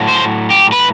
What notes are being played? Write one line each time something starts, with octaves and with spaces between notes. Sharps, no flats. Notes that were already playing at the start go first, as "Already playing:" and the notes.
Already playing: A2 F#3 A3
C5
G4
B4